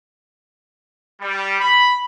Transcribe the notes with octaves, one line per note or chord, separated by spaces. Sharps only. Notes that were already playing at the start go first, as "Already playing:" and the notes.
G3
B5